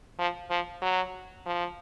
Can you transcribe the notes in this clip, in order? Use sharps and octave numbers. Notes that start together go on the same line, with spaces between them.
F3
F3
F#3
F3